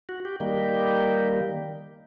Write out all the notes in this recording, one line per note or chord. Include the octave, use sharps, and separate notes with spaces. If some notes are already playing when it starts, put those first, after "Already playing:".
F#4
G4
D#3 G3 A#3 G4